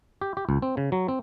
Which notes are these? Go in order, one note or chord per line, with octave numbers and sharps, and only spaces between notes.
G4
G4
C#2
C4
C#3
F#3
C4